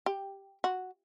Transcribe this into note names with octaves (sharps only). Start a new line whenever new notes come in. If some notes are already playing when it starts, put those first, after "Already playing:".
G4
F#4